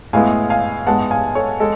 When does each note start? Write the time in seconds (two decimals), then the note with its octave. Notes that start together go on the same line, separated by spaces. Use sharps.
0.13 A2 G#3 B3 F5 G#5
0.50 F5 G#5
0.87 G#2 G#3 B3 F#5 A5
1.11 F5 G#5
1.35 A4 C#5
1.60 G#3 A4